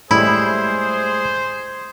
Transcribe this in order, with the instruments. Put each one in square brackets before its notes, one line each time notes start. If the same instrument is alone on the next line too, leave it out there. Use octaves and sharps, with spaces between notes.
[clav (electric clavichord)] A2 G3 G#3 [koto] E4 [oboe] G#4 [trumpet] C5